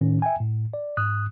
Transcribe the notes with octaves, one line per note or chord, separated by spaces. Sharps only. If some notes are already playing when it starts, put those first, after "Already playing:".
A2 D#3 C#4
E5 G5 G#5
A2
D5
G#2 D#6 F#6